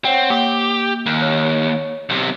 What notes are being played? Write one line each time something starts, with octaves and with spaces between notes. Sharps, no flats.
C4 C#5 F#5 G5
A#3 G4 D6
D#2
C#5
B1 C3